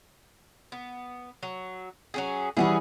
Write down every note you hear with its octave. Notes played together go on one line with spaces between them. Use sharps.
B3
F#3
F#3 C#4 G#4
E3 G3 C#4 E4 F#4 G#4